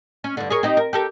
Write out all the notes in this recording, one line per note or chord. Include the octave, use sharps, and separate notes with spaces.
C#4
G2 D3
G#4 A#4 C#5
C4 D#4 G4
A#4
G4 A4 A#4